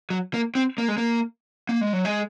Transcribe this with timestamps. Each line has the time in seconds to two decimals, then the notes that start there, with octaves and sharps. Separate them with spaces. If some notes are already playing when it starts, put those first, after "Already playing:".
0.10 F#3
0.34 A#3
0.55 C4
0.78 A#3
0.88 G#3
0.98 A#3
1.69 A#3
1.81 G#3
1.93 F#3
2.05 G#3